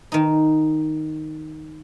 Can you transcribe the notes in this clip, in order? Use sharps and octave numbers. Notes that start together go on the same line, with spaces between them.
D#3 D#4